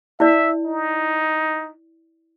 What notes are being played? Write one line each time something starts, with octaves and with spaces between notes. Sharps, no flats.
E4 D5 E5
D#4